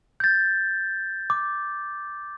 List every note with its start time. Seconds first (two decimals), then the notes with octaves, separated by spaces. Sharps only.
0.20 G6 A6
1.30 D6